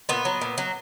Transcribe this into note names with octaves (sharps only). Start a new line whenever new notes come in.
A#2 B3
F#3
A#2
F#3